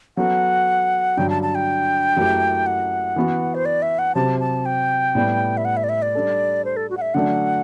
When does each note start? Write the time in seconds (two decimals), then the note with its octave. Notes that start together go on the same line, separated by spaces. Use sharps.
0.17 F#3 B3 F#4 A4 F#5
1.17 G2 D3 F#3 G5
1.30 A5
1.43 A5
1.55 G5
2.17 F#2 F#3 A3 E4 G4
2.66 F#5
3.16 E3 B3 F#4
3.55 C5
3.65 D5
3.82 E5
3.99 F#5
4.15 C3 F#3 C4 G4 A5
4.40 A5
4.66 G5
5.15 A2 G3 B3
5.57 E5
5.65 F#5
5.77 E5
5.84 D5
5.89 E5
6.02 D5
6.15 G3 D4 A4
6.65 C5
6.77 A4
6.90 F#4
6.97 F#5
7.01 E5
7.14 D3 F#3 A3 D4 F#5